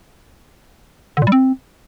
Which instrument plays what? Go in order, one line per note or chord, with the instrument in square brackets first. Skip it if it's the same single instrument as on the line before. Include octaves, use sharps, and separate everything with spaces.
[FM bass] D3
A#2
G3
C4